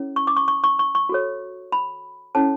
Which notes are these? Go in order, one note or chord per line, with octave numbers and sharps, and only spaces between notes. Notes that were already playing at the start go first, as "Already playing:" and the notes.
Already playing: C#4 E4 A4 C#5
C#6
D6
C#6
C#6
C#6
C#6
C#6
F#4 A4 C#5
B5
C#4 E4 A4 C#5 A5